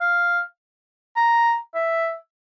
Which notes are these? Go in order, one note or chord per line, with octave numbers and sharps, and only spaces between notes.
F5
A#5
E5